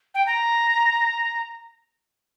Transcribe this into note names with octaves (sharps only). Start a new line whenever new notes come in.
G5
A#5